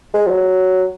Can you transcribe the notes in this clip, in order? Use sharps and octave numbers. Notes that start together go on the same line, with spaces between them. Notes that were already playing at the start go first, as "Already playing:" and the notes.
G#3
F3
F#3